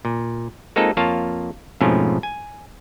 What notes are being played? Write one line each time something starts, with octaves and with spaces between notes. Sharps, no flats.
A#2
G#3 A#3 C4 D#4 F4 A4
F2 A#3 F4 C#5 F5 A5
F2 G#2 B2 F3 A3 C#4
G#5